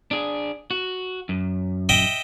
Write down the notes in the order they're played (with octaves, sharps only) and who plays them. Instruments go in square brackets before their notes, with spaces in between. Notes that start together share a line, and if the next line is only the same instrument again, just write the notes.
[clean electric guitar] D4 G#4
F#4
F#2
[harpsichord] D#5 E5 G5